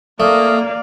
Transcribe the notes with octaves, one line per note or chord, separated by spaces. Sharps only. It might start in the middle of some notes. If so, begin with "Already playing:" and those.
A3 A#3 D5 F5 D#6